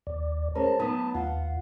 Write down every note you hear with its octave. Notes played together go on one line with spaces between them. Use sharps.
D#2 D5
G#3 C#4 A#4 C5 A5 A#5
F#3 B3 D#4 B5 D#6
D#2 F4 F#5